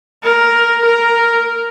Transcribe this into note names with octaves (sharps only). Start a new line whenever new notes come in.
A#4
A#4